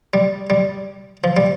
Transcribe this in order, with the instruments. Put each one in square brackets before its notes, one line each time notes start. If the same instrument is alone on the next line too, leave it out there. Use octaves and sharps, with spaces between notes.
[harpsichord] G3
G3
F3
G3